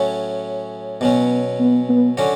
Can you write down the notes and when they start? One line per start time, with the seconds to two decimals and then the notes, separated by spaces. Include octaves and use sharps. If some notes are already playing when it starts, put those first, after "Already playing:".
Already playing: A2 F#3 C#4
1.01 B2 F#3 B3 C#4
1.60 B3
1.89 B3
2.17 D3 F#3 C#4 F#4